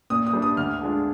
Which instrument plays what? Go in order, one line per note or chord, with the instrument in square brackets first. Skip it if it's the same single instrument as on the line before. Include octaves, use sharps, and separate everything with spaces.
[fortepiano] A#2 [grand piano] D#6
[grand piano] D#6
[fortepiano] G3 D4
[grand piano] D#6
[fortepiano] D2 [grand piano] F6
[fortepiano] D3 G#3 D4 F4